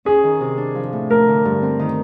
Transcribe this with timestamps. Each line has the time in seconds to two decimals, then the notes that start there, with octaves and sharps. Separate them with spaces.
0.05 C#4 G#4
0.24 D#3
0.41 C3
0.58 D4
0.75 F3
0.93 A2
1.10 A3 A#4
1.28 D3
1.45 G2
1.63 C4
1.79 D#3